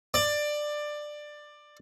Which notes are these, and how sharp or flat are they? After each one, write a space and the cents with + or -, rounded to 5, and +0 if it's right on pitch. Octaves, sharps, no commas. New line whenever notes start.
D5 +15